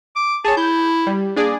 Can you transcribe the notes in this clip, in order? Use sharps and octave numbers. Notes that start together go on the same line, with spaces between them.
D6
G#4 C#5 A5
E4 G6
G3
A#3 D4 G#4 D5